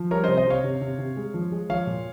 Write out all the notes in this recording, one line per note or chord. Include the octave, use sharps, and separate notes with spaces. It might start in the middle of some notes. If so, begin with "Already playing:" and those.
Already playing: F3
G3 A#4 C#5
C3 C5 D#5
C5 D#5
C3 C#5 F5
C3
C3
C3
G#3
F3
G#3
F3 C#5 F5
A#2